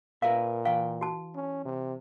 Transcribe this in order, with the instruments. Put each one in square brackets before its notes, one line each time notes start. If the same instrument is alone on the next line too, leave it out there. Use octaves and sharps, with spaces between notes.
[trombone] A#2 [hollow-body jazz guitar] A#4 B4 E5 [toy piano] F5
[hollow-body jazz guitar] E3 G5 [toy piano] F5
[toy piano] F#4 A5
[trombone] C#4
C3